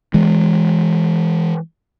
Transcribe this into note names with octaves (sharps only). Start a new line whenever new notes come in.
E3 G#3